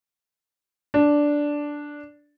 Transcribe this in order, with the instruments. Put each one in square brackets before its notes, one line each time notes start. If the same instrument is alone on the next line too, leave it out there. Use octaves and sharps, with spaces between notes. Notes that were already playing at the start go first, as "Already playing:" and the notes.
[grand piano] D4